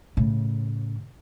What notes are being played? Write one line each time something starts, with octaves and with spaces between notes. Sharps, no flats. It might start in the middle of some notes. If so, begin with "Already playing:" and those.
A2 C#3